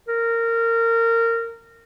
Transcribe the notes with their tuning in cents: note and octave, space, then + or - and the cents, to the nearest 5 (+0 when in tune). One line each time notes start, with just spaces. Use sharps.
A#4 -20